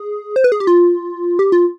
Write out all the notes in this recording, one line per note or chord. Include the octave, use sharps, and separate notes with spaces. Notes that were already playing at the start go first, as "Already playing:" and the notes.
Already playing: G#4
C5
B4
G#4
G4
F4
G4
F4